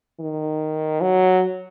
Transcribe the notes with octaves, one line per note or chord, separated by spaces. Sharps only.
D#3
F#3